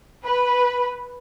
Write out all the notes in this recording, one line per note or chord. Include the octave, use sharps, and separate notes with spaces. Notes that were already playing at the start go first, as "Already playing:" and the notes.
B4